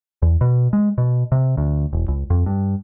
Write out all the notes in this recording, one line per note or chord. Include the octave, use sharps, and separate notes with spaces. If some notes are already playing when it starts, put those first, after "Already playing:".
E2
B2
G#3
B2
C3
D2
E1
C#2
F2
G2